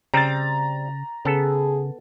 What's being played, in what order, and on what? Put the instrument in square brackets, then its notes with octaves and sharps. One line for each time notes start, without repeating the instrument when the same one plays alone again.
[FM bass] C#3 [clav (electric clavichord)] G3 C4 [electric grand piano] A#5 A6
[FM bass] C#3 [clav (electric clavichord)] B3 A4 [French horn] G#4